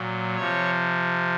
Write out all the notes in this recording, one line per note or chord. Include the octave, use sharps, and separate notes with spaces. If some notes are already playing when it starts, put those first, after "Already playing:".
Already playing: A#2 F#3
C3 F3 C#5